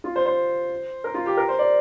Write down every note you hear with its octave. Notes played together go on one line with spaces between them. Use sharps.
F4
C5
C5
A#4
F4
G4
A#4
C5
D5